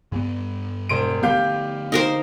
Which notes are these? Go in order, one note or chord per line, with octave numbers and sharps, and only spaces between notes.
G2 B3
E1 C5 D7
D3 A3 B3 G4 F5 G6
D#4 A#4 C5